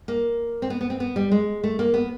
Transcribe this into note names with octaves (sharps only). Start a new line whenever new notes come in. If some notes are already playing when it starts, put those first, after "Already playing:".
A#3
C4
B3
B3
C4
B3
G3
G#3
A3
A#3
B3